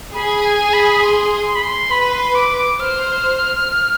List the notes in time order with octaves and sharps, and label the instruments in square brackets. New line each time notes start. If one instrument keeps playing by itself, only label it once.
[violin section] G#4 [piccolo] B5
[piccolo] G#5
G#5
B5
C6
C6
B5
C6
[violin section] B4 [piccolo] B5
[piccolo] C6
D6
D6
[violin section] C5 [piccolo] F6